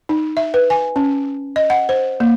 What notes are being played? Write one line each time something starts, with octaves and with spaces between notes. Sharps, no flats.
D#4
E5
B4
G#5
C#4
D#5
F#5
C5
A#3